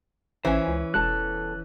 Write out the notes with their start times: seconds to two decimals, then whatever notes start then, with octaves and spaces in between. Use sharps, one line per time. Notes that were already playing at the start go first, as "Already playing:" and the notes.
0.45 A1 E3 C#4 C5 E5 G#5
0.67 C#2
0.94 E1 E2 A4 A5 F#6